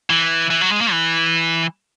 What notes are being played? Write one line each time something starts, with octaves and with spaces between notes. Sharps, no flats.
E3
E3
F#3
G#3
A#3
E3